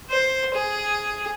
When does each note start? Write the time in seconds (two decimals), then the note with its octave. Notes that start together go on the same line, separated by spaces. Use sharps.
0.10 C5
0.55 G#4